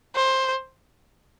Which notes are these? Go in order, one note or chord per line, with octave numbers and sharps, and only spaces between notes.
C5